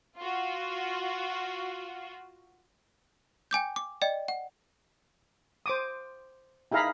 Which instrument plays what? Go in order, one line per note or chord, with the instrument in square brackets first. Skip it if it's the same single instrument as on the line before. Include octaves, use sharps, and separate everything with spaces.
[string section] F4 F#4
[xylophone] G5 G#5 D6 G6
D6
D5 D#5 G5
F#5
[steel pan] C5 D6 D#6
D#4 E4 G#4 F5 A#5 B5